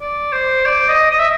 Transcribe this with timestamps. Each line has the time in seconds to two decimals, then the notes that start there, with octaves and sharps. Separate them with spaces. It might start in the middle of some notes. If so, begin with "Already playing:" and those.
0.01 D5
0.33 C5
0.66 D5
0.89 D#5
1.10 D#5
1.19 E5